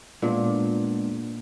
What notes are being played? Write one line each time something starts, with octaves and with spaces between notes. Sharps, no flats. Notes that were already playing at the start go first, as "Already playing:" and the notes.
A#2 G#3 B3 D4